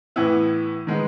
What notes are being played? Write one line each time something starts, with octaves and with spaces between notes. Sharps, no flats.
A2 E3 B3 E4
D#3 G#3 B3